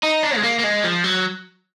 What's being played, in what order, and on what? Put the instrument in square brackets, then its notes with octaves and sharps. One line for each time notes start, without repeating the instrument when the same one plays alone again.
[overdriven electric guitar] D#4
D4
G#3
A#3
A#3
G#3
F3
F#3